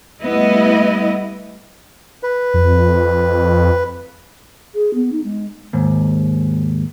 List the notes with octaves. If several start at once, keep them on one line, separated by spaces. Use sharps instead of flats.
G3 A3 B3 E4 D#5
B4
F2
G#4
B3
D#4
G#3
D#2 G#2